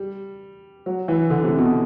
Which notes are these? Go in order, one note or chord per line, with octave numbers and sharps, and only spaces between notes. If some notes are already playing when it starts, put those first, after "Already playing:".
Already playing: G3
F#3
E3
D3
C3
B2